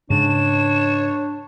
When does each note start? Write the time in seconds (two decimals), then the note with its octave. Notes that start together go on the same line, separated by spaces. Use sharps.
0.10 G#2 C#3 D4 C#5 E7